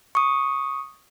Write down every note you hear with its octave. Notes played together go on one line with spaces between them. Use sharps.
C#6 D#6